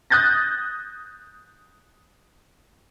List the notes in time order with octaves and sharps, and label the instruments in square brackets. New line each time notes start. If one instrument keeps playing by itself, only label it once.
[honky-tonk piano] D#6 F#6 G6 A6 A#6